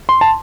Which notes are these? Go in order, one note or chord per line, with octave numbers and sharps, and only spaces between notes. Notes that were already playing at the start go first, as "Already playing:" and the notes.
C6
A5